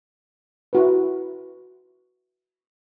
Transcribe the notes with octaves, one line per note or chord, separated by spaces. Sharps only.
E4 F#4 B4